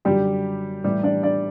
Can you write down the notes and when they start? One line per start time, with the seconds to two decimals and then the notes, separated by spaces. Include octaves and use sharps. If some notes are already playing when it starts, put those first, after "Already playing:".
0.05 F#2 D3 F#3 G3 G4
0.84 A2 E3 G3 G4
1.03 D4 D5
1.23 D4 D5